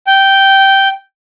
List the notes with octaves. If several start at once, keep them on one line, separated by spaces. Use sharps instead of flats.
G5